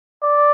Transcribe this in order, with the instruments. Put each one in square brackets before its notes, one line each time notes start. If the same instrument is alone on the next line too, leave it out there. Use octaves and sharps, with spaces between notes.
[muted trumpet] D5